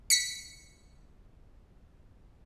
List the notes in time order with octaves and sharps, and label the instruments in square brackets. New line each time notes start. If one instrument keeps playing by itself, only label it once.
[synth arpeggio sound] B6 C#7